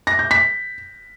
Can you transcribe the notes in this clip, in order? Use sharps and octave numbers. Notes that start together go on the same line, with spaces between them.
A#6
G6
B6